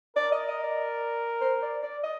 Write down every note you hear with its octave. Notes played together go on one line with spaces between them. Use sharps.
A#4 D5
D#5
D#5
D5
C5
D5
D5
D#5